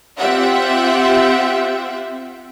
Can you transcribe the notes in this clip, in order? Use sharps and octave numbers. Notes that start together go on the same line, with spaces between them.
C4 F4 G4 E5 F#5